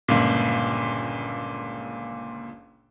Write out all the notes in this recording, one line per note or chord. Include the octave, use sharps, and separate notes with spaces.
G1 C#2 A#2